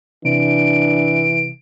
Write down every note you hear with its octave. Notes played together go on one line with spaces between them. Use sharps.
C3 E3 D4 D7